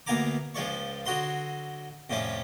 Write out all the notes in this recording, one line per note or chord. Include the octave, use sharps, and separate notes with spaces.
D2 A#3 B3 G#5 A#5 D6
C#2 F3 G#3 D5 C#6
D3 F#3 F#4 D#5 C6
F2 A2 C3 G3 C#4